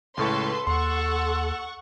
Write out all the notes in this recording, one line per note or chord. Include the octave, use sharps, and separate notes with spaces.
C#2 A2 A4 B4 C6 C#6
D#2 A4 F#5 C6 C#6